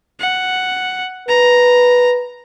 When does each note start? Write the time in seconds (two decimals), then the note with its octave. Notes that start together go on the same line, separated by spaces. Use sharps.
0.20 F#5
1.28 B4 A#5